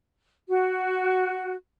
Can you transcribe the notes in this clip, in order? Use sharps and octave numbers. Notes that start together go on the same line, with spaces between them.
F#4